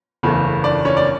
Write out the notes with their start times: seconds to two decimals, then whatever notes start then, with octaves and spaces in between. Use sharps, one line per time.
0.23 F#1 E2 C#3 E3 A3
0.64 D4 D5
0.85 C#4 C#5
0.97 D5